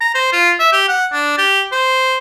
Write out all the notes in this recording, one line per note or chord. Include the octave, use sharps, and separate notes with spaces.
A#5
C5
F4
E5
G4
F#5
D4
G4
C5